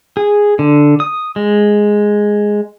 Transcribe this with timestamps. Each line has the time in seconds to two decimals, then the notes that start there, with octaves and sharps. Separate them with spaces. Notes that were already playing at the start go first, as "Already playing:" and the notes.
0.17 G#4
0.59 D3
1.00 D#6
1.36 G#3